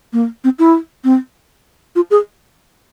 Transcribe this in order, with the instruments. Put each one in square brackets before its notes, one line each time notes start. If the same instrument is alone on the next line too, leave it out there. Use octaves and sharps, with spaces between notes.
[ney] A#3
C4
E4
C4
F4
G#4